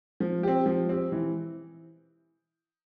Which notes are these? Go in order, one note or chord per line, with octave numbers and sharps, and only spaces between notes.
F3
C4 G4
F3
C4 G4
E3